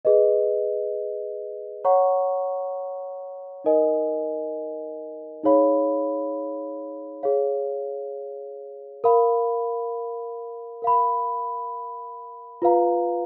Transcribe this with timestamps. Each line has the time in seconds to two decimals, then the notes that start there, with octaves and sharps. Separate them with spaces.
0.05 G#4 B4 D#5
1.84 C#5 F#5 A#5 C#6
3.64 D#4 A#4 D#5 G#5
5.43 D#4 G#4 C#5 F5 B5
7.23 G#4 C#5 F5
9.04 A#4 F5 B5
10.82 A#4 F5 B5
12.62 F4 B4 F5 A#5